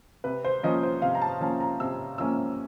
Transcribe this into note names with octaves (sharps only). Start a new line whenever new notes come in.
C3 B4
C5
F3 A#3 C#4 D#5
C5
C3 F5
A#5
A5
F3 A#3 C#4 A5
A#5
C3 E6
F3 A#3 C#4 E6